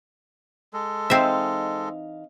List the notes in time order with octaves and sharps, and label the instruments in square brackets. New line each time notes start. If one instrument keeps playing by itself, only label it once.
[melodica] G#3 A4
[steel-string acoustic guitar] E3 D#4 F5 [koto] C4 E5 [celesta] C5 G5